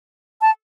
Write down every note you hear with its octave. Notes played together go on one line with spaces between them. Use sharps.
A5